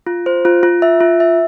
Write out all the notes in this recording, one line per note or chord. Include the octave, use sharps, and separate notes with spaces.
F4
C5
F4
F4
E5
F4
E5